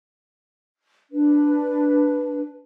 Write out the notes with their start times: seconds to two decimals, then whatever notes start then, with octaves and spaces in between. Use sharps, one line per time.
1.11 D4 B4